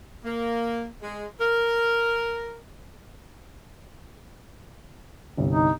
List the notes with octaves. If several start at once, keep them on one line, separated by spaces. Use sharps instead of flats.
A#3
G#3
A#4
G1 C2
D#4